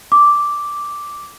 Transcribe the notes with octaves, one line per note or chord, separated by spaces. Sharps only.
D6